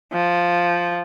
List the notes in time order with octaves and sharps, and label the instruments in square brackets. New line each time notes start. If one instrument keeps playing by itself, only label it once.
[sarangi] F3